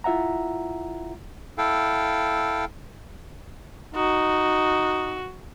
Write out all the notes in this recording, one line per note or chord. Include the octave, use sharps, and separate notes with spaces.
E4 F4 E5 F#5 A#5
E4 A4 F5 G5
D#4 F#4